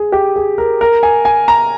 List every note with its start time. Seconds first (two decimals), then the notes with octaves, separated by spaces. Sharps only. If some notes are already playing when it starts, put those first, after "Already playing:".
Already playing: G#4
0.12 G4
0.36 G#4
0.58 A#4
0.81 A#4
1.03 G#5
1.25 G#5
1.48 A#5